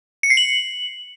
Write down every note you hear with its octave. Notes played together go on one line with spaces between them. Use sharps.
C#7
C7
F#7